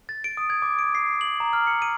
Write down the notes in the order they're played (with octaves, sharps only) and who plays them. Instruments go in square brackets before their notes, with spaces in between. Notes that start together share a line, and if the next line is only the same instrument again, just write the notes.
[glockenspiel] A6
D7
D#6
G#6
D6
D7
C7
F#7
A#5
F6
C#7
D#7